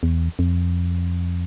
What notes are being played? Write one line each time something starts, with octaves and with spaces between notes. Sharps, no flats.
E2
F2